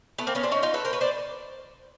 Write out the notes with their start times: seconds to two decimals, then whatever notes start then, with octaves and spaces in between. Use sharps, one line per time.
0.18 A3 B3
0.27 A#3 C4
0.35 B3 C#4
0.43 C4 D4
0.52 C#4 D#4
0.63 D#4 F4
0.74 A4 B4
0.85 A#4 C5
0.93 B4 C#5
1.01 C5 D5